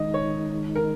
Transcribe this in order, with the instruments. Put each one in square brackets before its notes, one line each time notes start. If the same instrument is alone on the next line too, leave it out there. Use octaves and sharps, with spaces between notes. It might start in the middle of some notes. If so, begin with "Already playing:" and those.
Already playing: [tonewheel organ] D#3 G#3 D#4 [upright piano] D#5
[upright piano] C#5
A#4